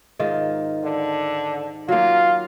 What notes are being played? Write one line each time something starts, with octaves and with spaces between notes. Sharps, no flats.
G#2 D#3 F4
D3
F#3 A#3 F4